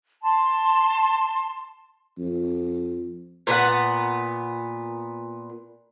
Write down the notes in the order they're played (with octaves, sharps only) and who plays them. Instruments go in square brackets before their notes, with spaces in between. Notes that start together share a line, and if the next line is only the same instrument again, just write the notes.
[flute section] A5 C6
[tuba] F2
[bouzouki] A#2 B3 D4 F#5